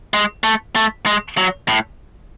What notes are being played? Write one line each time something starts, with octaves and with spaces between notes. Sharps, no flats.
G#3
A3
A3
G#3
F#3
A2